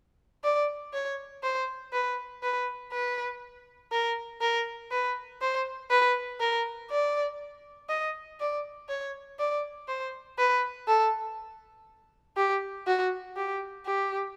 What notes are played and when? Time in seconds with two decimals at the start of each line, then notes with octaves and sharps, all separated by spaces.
0.44 D5
0.93 C#5
1.43 C5
1.93 B4
2.43 B4
2.92 B4
3.92 A#4
4.41 A#4
4.92 B4
5.41 C5
5.90 B4
6.40 A#4
6.90 D5
7.89 D#5
8.40 D5
8.89 C#5
9.39 D5
9.88 C5
10.38 B4
10.87 A4
12.37 G4
12.87 F#4
13.37 G4
13.86 G4